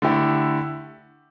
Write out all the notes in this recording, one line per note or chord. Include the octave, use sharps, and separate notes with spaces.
D3 A3 E4 G4